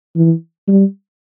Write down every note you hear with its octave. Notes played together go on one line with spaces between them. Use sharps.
E3
G3